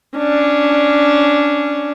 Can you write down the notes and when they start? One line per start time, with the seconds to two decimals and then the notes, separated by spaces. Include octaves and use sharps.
0.17 C#4 D4